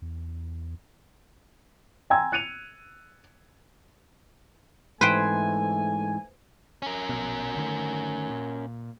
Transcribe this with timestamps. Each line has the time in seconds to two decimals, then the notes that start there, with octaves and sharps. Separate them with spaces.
0.02 E2
2.10 G5 G#5 A#5 C6 E6 G#6
2.32 F#6 C#7 D#7 F7
5.01 G#2 E3 A3 B4 C5 G5 G#5
6.82 C#4 A#4
7.09 A#1 B2
7.56 D3 D#3 A3
8.30 A#2